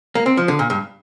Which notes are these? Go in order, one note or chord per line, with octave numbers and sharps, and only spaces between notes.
A#3
C4
F3
D3
A#2
G2